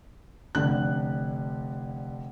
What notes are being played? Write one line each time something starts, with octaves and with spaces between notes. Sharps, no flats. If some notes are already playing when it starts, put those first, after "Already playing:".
F1 D3 F#6